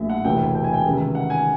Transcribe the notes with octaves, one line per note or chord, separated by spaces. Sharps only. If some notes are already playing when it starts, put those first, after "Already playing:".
Already playing: A#1 A2 F#3 A#3 E5
F#5
E1 D2 C3 E3 G5
G5
G#5
G5
C#2 C3 D#3
F#5
G#5